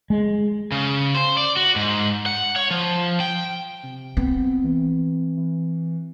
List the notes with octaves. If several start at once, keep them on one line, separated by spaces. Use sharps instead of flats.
G#3
C#3
C5
D5
F#4
G#2
F#5
C#5
F3
G5
C3
B3 C4
E3
E3